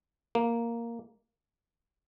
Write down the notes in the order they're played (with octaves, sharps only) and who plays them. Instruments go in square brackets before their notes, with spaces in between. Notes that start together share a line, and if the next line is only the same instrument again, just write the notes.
[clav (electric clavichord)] A#3